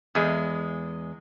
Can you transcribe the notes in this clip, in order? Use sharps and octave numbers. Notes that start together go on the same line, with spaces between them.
E2 G#3